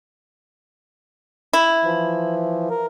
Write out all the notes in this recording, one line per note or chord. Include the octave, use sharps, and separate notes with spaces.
E4
E3 F3
A#4